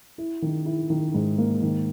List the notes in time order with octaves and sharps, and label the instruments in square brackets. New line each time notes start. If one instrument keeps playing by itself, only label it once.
[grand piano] E4
D#3
E4
D#3
G#2
A#3
D#3